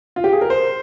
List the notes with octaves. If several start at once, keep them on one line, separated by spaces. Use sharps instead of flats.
F4
G4
G#4
A#4
C5